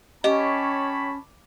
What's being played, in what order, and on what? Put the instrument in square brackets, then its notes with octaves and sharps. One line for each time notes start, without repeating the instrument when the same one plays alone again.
[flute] C#4 [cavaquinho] G4 [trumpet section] C#5 A5 B5 [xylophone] D#5